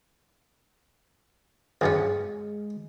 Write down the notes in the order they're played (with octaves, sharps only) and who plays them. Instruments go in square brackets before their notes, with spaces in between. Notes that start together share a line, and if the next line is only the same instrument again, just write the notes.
[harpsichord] C#2 G2 C#4 [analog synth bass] G#3